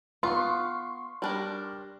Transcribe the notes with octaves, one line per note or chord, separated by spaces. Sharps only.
B3 F4 C6 C#6
G3 D4 A#4